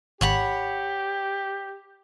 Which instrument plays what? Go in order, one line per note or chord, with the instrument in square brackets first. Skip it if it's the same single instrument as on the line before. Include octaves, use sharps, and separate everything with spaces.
[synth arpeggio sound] G#1 [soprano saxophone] G4 [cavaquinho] C#5 F#5 B5